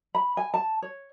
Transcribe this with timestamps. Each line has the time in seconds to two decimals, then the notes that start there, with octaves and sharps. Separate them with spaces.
0.15 B5
0.37 G#5
0.54 A5
0.82 C#5